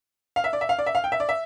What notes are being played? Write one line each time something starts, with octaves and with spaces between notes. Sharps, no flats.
F5
E5
D5
E5
F5
D5
E5
F5
G5
E5
D5
E5